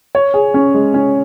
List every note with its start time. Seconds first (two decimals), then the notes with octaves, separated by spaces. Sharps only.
0.15 C#5
0.34 G#4
0.54 C#4
0.74 G#3
0.94 C#4